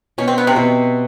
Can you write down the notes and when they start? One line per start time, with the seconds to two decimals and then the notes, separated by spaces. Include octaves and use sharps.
0.18 B2 C#4
0.28 C4
0.38 B3
0.47 C3 C4
0.56 B2